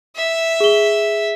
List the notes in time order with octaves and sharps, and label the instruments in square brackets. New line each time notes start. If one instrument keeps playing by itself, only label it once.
[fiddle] E5
[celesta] G#4 G7